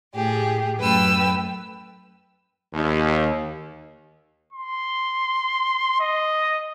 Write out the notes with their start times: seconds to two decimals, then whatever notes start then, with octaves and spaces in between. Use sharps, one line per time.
0.15 A2 G4 G#4
0.78 F#2 A3 B4 G5 E6
2.73 D#2
4.53 C6
6.00 D#5